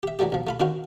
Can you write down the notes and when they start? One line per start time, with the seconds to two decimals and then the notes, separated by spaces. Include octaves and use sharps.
0.03 G4 E5
0.19 E3 F#3 G3 A3 G4
0.32 B1 F3
0.47 A3 F4 B5
0.60 D#3 C4 C#4 F4 F#4 C5